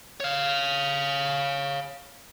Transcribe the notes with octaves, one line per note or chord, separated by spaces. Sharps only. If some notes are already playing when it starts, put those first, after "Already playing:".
C#5 F5